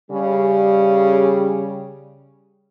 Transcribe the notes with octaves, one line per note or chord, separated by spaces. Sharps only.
C#3 G3